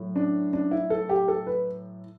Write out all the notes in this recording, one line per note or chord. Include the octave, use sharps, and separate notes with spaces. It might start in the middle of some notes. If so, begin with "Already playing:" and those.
Already playing: A2 F#3
D4
D4
E4
A4
G4
A4
B4